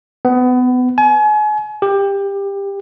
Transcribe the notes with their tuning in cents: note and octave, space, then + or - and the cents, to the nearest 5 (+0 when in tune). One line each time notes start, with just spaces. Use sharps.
B3 +25
G#5 +35
G4 +20